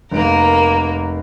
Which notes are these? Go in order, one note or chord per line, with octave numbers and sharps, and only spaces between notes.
F1 A#3 A#4 D7